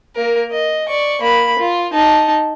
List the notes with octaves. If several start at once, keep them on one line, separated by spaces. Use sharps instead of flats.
A#3 A#4
D#5
D5 C#6
A#3 B5
F4
D#4 A5